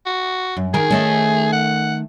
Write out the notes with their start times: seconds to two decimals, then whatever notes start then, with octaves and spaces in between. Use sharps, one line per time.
0.06 F#4
0.57 F#2
0.74 D#3 G#4 A#4
0.91 D#3 A3 C#4
1.52 F#5